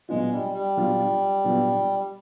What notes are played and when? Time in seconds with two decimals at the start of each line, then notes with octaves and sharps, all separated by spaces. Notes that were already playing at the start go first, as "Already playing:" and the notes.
0.09 A#2 F#3 G#3 B3 D4 F4
0.32 G3
0.54 G3
0.77 A#2 F#3 B3 D4 F4
1.44 A#2 F#3 B3 D4 F4